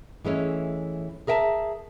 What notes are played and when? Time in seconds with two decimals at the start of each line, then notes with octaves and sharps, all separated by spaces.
0.25 E3 G#3 A3 C#4
1.27 G#4 A#4 E5 G5 A5